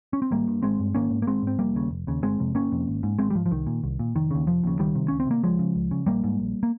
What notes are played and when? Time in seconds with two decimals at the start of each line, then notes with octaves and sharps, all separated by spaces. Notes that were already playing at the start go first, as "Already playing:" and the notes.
0.13 C#4
0.22 C4
0.31 G#1 G3 A#3
0.48 G2
0.63 G#1 G#3 C4
0.80 G2
0.95 G#1 A#3 C#4
1.11 G#2
1.22 A#3
1.27 G#1 G#3 C4
1.43 G#2 C4
1.59 F1 G3 A#3
1.75 D#2 C#3
1.91 F1
2.07 D#2 C#3
2.22 G1 G#3 C4
2.39 F2 C3
2.55 G1 A#3 C#4
2.72 F2 C3
2.87 G#1
3.03 G#2
3.19 G#1 G#3 C4
3.30 G3
3.35 G#2 F3
3.46 F3
3.51 C2 D#3
3.66 A#2
3.84 C2
3.99 A#2
4.15 F1 D#3
4.31 D#2 C#3
4.47 F1 F3
4.64 D#2 C#3
4.79 C#2 D#3 G3
4.95 C3
5.08 C#2 C#4
5.20 C4
5.27 C3 A#3
5.43 C#2 F3 G#3
5.59 C#3
5.75 C#2
5.91 C#3
6.06 A#1 G3 A#3
6.24 G#2
6.40 A#1
6.63 A#3